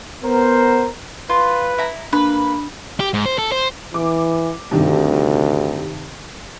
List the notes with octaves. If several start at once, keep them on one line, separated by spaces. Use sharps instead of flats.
B3 A#4 C5
F4 B4
E4 A#5
A#3 D4 B4
G4
G#2
C5
A4
C5
E3 D6
D2 G2 C3 D#3